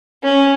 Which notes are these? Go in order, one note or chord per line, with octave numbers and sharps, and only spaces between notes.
C#4